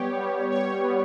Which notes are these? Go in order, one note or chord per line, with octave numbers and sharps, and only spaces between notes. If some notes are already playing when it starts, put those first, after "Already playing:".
Already playing: G3 B3 G4 C#5
G3
C#5
B3